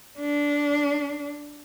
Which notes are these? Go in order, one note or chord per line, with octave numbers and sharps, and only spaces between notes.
D4